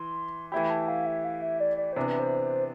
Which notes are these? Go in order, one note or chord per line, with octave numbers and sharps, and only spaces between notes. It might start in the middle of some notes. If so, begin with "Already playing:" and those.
Already playing: E3 C6
E3 A3 E4 G4 B5
A5
F5
E5
F5
E5
D5
D5
C3 E3 B3 D4 C5
B4
C5